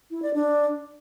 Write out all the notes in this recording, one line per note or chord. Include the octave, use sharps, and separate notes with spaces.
E4
D5
D4